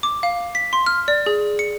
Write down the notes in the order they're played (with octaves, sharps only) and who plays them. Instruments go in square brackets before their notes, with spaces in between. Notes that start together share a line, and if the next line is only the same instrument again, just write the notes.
[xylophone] D6
F5
B6
C6
F6
D5
G#4
C#7